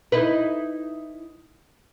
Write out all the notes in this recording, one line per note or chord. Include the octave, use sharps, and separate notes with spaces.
D#4 E4 B4